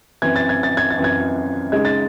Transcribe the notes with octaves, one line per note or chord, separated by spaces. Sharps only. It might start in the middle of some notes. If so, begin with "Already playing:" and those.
F#2 E3 C4 G#6
A6
G#6
A6
G#6
A6
F#2 E3 C4
G#6
C#3 G#3 D#4 G#6
A6